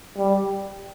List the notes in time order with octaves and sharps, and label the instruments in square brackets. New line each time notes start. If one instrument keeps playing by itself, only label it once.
[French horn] G3